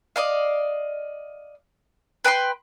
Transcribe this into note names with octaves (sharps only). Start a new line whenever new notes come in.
D5 D#5 F5
B4 G5 A#5 C6